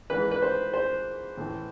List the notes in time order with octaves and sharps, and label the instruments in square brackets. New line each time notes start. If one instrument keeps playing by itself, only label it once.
[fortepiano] G#2 E3 B4
B4
C5
C5
A2 E3